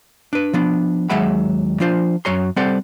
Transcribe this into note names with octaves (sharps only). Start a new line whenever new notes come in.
D4 B4
F3 B3 D4
D#2 F#3 G#3 E5 F#5 B5
F3 D4 F4 C5
F#2 F#3 C#5 A#5 C6
G3 C4 A4 C5 D5 F#5